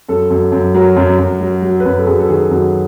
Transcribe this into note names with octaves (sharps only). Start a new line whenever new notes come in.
F#2 A4
F#2
F#2
F#3 A#4
F#2
F#2
F#3
F#3
B4
F#2 A#4
A4
F#2 G#4
A4
D#3 G#4
F#2 F#4